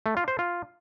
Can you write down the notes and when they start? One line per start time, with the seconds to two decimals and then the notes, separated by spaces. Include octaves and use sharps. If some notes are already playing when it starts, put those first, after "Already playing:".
0.06 A3
0.17 F4
0.28 C5
0.39 F4